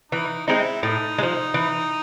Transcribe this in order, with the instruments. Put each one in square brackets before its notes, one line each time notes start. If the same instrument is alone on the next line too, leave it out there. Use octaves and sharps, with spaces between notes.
[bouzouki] E3 [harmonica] D#4
[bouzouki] G#3 C4 D#4 [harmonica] E4
[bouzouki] A2 [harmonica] D#4
[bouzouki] G#3
F3
E3